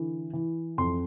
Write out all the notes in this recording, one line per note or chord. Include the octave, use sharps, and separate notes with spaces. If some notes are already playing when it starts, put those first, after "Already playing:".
Already playing: D3 E3
E3
F2 C6